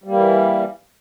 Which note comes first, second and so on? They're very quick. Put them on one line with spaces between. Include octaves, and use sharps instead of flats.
G3 A#3 E3